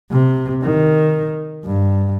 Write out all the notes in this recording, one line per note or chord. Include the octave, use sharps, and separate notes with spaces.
C3
D#3
G2